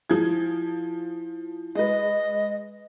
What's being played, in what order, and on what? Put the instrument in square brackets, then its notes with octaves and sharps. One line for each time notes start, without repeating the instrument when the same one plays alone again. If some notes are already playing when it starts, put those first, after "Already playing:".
[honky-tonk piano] F3 G#4 G#6 [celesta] E4
[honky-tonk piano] G#3 B4 [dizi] D#5